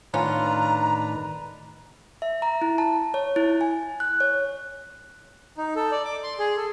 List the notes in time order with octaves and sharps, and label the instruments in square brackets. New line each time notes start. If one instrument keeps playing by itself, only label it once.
[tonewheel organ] A2 D#3 [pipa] B3 C#4 F4 [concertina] D4 B4 [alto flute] A#5
[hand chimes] E5
A#5
E4
A5
C#5
E4
G#5
F#6
C#5
[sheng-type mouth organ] D#4
A4
D5
D6
C6
G#4
A4